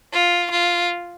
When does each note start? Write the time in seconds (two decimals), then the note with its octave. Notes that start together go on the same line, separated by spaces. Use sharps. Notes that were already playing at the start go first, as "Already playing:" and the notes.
0.13 F4
0.51 F4